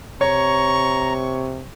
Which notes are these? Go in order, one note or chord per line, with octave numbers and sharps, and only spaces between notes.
C3 C#5 A#5 C#6